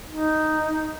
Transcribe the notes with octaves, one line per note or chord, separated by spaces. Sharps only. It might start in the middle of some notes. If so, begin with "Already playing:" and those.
D#4